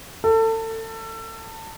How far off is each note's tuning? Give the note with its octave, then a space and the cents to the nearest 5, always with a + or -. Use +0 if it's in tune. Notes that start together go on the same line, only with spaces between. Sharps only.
A4 +30